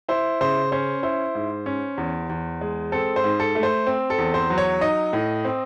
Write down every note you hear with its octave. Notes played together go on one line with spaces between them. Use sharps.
E4 C5
C#3 C5
C#4 C5
E4 C5
G#2
C#4
E2
E2
G#3
C4 A4
C5
G#2
A4
A3
C5
C4
A4
E2
C5
F#3
C#5
D#4 D#5
A2
C4